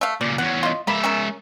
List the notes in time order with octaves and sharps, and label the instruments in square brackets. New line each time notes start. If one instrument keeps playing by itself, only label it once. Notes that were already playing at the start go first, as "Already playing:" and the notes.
[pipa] A3 F5
[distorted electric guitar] A#2 C#3 [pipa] D5
[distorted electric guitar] E2 C#4 [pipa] F#5
[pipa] F4 D#5
[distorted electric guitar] G#3 E5 [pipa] A#3 B5
[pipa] C#4 G#4 A#4